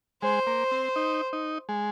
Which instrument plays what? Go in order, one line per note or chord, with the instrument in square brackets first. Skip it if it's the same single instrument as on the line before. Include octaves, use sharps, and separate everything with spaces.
[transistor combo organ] G#3 [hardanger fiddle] C5
[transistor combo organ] A#3
C4
D#4
D#4
G#3